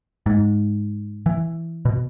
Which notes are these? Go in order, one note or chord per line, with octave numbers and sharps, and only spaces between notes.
G#2
E3
B2